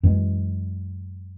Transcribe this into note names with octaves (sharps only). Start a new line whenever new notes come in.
F#2 E3 G#3